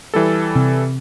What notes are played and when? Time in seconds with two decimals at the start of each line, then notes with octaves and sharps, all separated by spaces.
0.14 E3 G3 A4
0.55 C3